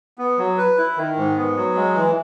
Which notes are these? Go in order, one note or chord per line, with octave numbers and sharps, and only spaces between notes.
B3
F#3
B4
E4
D#3
G#2
B3
F#3
G#3
E3